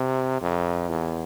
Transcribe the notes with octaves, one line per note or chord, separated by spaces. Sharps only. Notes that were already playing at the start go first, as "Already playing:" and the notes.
Already playing: C3
F2
E2